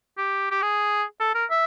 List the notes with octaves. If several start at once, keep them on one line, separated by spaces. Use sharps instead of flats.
G4
G4
G#4
A4
A#4
E5